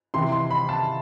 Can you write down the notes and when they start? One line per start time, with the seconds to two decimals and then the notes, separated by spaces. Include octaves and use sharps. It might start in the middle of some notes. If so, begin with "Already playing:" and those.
0.14 C3 E3 C6
0.32 C6
0.51 B5
0.69 A5